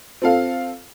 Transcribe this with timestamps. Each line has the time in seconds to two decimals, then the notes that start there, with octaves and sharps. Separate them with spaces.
0.22 C4 F4 A4 F5